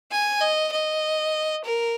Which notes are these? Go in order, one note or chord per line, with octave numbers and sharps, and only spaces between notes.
G#5
D#5
D#5
A#4